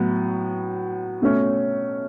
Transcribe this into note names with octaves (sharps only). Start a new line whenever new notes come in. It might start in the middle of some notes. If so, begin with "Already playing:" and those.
Already playing: A2 F#3 B3
B2 A3 C#4